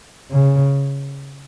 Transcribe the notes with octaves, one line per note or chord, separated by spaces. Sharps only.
C#3